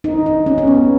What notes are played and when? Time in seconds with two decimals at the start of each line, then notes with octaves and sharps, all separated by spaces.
0.04 D#4
0.26 D#4
0.46 C#4
0.58 C#4
0.67 B3